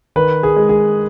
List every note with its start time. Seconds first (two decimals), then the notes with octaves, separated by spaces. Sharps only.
0.16 D#3 B4
0.43 G#4
0.56 G#3
0.69 G#4